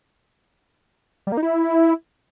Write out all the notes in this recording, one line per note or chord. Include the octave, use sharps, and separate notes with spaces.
G3
A#3
D#4
E4